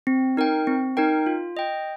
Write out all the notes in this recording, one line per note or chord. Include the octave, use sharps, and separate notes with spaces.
C4
D#4 A#4 G5
C4
D#4 A#4 G5
F4
D#5 G5